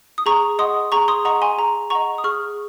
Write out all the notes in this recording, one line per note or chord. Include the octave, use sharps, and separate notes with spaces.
D#6
G#4 A#5 C#6
D#5 F#5 C6 D#6
G#4 A#5 C#6
C6 D#6
D#5 F#5 A#5 C#6
G#5 C6
G#4 A#5
D#5 F#5 A#5 C#6
D#6
G#4 C#6 F6